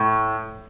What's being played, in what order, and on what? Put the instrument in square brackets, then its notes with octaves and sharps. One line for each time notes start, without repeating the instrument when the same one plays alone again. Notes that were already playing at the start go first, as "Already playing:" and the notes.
Already playing: [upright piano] A2